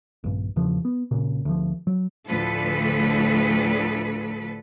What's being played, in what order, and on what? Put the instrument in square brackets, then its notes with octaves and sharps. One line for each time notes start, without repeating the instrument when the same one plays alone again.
[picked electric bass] A#1 G2
E2 C#3 F3
B3
A#1 A#2 C#3
D2 F3
F#3
[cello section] D2 A2 D3 F3 A4 B4